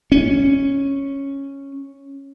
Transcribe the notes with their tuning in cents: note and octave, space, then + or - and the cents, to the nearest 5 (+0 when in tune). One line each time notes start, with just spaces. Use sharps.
C#4 -5